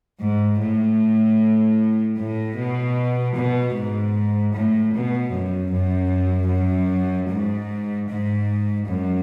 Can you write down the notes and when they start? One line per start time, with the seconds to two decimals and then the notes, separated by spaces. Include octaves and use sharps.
0.20 G#2
0.60 A2
2.18 A2
2.57 B2
3.36 B2
3.74 G#2
4.54 A2
4.93 B2
5.32 F#2
5.72 F#2
6.50 F#2
7.29 G#2
8.08 G#2
8.87 F#2